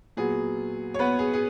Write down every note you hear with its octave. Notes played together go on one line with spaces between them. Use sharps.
A#2 F#3 B3 G#4
C#5
B3 B4
G#4
G#4